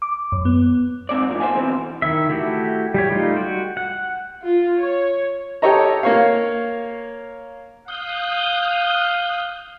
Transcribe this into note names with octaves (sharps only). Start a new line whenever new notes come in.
D6
F#2
B3
G#2 C4 D5
G2 A#2 F3
A4 C5 E5 F5 G#5
B2 E3 C4
D#3 E4 E5
A3 E4 F#4 G4
G3 G4 C#5
G3 A3 D#4 F4
F#4 G5
F#5
F4
C#5
G4 A4 C#5 D#5 A#5
A#3 C#5 F5
F5 D#6 F#6 G6